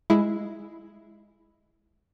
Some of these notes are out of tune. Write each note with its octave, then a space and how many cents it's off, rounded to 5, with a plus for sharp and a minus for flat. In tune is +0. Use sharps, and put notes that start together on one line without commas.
G#3 +0 E4 +0